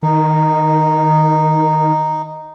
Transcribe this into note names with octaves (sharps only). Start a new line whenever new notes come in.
D#3 D#4